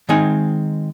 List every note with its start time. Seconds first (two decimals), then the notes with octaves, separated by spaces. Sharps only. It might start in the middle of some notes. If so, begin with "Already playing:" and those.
0.09 D#3 G#3 C4 D#4 G#5